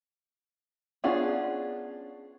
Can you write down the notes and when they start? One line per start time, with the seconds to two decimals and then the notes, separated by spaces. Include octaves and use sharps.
1.04 B3 C#4 D4 F4 G#4